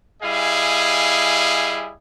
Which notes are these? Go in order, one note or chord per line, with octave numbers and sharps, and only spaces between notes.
G3 E4 G#4 D#5 F5 G#5